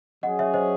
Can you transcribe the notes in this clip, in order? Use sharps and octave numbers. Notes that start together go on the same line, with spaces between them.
F#3 C#4 G#4 D#5 F#5
C#5 E5
C5 D#5